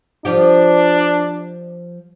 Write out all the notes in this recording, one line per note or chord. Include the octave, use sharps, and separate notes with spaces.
F3 D4 G4